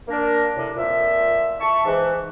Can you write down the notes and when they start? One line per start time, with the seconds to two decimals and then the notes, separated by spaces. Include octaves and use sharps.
0.08 A#3 D4 A#4
0.56 A2 C3
0.76 F2 A#2 F3 E5
1.60 E5 A5 C#6
1.86 G#2 E3